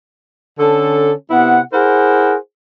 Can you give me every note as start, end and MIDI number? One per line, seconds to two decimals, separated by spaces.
0.59 1.13 50
0.59 1.13 61
0.59 1.13 69
1.31 1.61 48
1.31 1.61 59
1.31 1.61 64
1.31 1.61 78
1.73 2.35 64
1.73 2.35 68
1.73 2.35 70
1.73 2.35 72
1.73 2.35 78